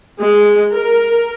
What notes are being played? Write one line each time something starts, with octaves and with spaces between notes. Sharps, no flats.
G#3
A#4